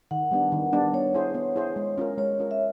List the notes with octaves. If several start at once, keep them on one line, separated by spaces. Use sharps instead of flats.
D#3 F#5
G3 B3 D4
D#3
G3 B3 D4
B3 C#5
E4 G#4 C5
B3
E4 G#4 C5
G#3
C#4 F4 A#4
G#3 C#5
C#4 F4 A#4
E5